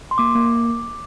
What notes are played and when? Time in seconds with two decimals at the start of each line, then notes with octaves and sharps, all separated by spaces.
0.11 C6
0.18 A#3 D6
0.35 A#3